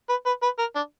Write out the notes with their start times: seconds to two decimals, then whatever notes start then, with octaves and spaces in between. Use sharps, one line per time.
0.09 B4
0.26 B4
0.42 B4
0.59 A#4
0.75 D4